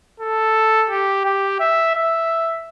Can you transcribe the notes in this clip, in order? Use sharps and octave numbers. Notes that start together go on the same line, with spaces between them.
A4
G4
G4
E5
E5